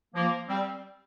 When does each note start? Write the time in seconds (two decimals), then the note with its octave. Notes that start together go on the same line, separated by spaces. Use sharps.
0.15 F3 A#3
0.48 G3 C4